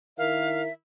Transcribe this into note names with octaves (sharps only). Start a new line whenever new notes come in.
D#3 E4 A#4 E5 F5